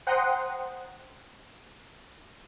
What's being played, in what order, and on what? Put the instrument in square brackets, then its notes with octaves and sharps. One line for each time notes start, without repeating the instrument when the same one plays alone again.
[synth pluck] C5 F#5 G5 A#5 C6 D#6